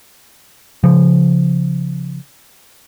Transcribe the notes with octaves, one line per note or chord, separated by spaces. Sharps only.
C#3 F3